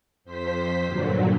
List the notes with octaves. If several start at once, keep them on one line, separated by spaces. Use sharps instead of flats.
F2 C5 B6
G2 A#2 D3 F#3